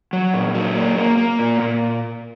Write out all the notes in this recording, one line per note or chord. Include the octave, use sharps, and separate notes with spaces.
F#3
A#2
F#3
A#3
A#3
A#3
A#2
A#2